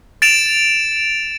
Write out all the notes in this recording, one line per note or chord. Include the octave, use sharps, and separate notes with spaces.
A6 D7 E7 F7